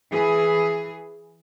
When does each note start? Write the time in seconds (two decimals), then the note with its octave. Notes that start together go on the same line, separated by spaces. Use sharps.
0.11 E3 G#4